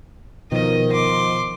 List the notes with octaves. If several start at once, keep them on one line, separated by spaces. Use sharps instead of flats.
B2 D#3 F3 D#5
C6 D6